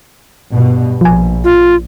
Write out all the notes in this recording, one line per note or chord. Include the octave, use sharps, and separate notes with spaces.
G2 B2
A#1 F3 G#5
F4